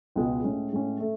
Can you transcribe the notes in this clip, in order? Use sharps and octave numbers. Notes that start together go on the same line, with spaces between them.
C#2 B2 G#3 B3 F4
A2 G#3 C#4
A2 G#3 C#4
A3